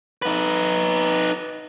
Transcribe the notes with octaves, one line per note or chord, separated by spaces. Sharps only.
D#4 B4